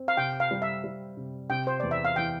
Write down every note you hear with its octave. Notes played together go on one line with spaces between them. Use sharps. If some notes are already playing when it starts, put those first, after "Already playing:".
Already playing: C4
F5
C3 G5
F5
G3
E5
G3
C3
C3 G5
C5
E2 D5
E5
F5
E3 G5